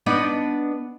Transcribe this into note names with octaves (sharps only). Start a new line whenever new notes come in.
B3 D4 D#4